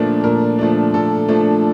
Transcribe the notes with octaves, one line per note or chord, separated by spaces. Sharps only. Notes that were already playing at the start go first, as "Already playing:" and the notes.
Already playing: A#2 F3 A3 D4 A#4
A#2 A#4
F3 A3 D4
A#2 A4
F3 A3 D4